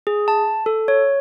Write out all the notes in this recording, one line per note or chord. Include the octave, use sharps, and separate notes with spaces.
G#4
A5
A4
C#5